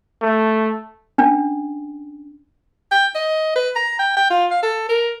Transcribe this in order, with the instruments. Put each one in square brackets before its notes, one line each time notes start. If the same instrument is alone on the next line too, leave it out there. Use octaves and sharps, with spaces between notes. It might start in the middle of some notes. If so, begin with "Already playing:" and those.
[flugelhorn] A3
[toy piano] C#4 D4
[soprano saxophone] G5
D#5
B4
A#5
G5
G5
F4
F5
A4
A#4